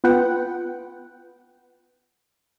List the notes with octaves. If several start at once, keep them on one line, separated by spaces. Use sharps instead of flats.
B3 F4 B4 F#5 G5